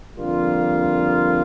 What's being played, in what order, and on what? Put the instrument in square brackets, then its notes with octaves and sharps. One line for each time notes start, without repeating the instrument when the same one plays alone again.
[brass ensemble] F2 D3 G3 A#3 F4